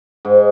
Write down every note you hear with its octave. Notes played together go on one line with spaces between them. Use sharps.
G#2